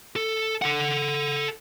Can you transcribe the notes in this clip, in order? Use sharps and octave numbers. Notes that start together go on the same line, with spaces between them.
A4
A4 F#5